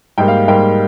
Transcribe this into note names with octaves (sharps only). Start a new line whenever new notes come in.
G#2 G3 A#3 G5
F5
G#2 G3 A#3 G5